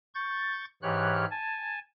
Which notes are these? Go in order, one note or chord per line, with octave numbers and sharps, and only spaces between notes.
C#6 G6 A6
G#2 E3 G4 C#5 F6 F#6
G#5 A5